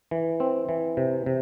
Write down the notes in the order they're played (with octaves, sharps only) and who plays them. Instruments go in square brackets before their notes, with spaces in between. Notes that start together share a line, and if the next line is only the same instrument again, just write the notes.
[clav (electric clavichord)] E3
C4
E3
C3
C3